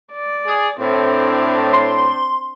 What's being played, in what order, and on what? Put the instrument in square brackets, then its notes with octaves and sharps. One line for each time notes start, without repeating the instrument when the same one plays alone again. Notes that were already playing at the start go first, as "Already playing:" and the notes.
[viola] D5
[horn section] G#4
[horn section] A2 [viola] C4 D4
[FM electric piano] C6